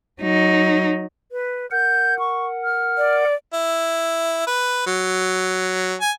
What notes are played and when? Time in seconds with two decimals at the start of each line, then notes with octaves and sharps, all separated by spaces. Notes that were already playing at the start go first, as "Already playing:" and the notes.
0.22 F#3 D#4
1.32 B4
1.71 A#4 F#5 G6
2.19 C#6
2.64 F6
2.98 D5
3.53 E4
4.47 B4
4.86 F#3
6.01 G#5